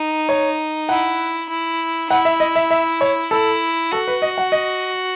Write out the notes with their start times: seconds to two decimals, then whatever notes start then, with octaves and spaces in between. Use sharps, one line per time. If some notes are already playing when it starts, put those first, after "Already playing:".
Already playing: D#4
0.29 C#5
0.89 E4 F#5
1.49 E4
2.10 E4 F#5
2.25 E5
2.40 D#5
2.56 E5
2.71 E5
3.01 C#5
3.31 E4 A4
3.92 F#4 A4
4.07 B4
4.22 D#5
4.38 F#5
4.52 D#5